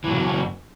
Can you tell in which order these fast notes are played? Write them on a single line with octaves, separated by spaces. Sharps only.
E3 A2 F#3 C#3 F#2